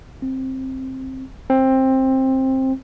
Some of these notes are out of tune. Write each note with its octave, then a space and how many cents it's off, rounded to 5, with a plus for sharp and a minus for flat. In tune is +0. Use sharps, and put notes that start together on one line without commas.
C4 +10
C4 +15